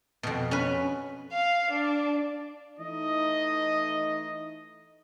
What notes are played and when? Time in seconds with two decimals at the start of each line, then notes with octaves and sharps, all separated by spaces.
0.23 F2 B2
0.51 C#4 B4
1.32 F5
1.71 D4
2.79 E3 A3 D#4 D#5